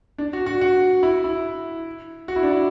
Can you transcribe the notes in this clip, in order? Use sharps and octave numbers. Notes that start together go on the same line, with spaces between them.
D4
F#4
F#4
F#4
E4
E4
F#4
E4
D4
E4